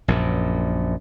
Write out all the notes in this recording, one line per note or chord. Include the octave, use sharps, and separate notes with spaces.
A#1 F#2 A#2